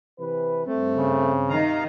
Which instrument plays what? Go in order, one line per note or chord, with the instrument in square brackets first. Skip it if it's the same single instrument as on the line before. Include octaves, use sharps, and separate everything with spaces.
[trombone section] C3 E3 B4
[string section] G2 [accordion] A3 [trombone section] C4
[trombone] C#3
[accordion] C3 F5 A#5 [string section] D#3 D#4